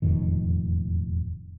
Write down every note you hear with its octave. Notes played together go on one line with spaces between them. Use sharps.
E1 F2 A2 D#3